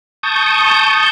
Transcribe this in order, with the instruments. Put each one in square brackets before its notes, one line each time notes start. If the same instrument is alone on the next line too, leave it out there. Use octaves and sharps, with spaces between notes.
[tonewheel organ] A5 C#6 D#6 G6